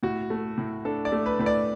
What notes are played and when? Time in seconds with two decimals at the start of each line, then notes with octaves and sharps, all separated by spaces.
0.03 A2 F#4
0.30 A3
0.58 A2
0.85 D4 A4
1.05 D5
1.12 A3
1.26 B4
1.39 A2 B4
1.46 D5